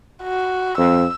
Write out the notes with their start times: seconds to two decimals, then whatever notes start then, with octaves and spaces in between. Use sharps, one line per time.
0.23 F#4
0.78 F2 E6